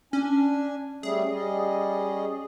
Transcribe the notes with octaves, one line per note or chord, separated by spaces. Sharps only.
C#4 D4 G#5
G3 A3 C#4 G#4
G3 C#4 D#5